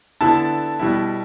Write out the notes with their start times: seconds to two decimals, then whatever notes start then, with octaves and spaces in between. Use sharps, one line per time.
0.21 D3 B3 E4 A4 A5
0.79 B2 G3 E4